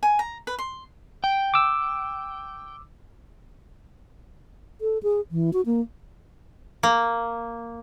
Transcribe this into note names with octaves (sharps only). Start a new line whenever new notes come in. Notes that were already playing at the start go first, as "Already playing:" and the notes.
G#5
A#5
B4
C6
G5
D6 E6
A4
G#4
E3
F#4
A#3
A#3